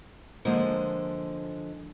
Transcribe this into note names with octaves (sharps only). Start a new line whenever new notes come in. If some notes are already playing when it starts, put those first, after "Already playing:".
D3 F3 G#3 A#3 F4 C5